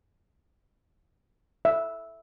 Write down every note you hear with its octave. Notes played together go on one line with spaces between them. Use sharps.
E5